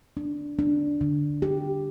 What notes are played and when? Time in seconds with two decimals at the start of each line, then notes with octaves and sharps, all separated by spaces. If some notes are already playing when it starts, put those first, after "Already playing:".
0.17 D4
0.59 D4
1.01 D3
1.42 G4